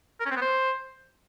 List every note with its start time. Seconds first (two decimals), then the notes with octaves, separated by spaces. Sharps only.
0.20 A#4
0.25 C#4
0.31 C4
0.36 B3
0.41 C5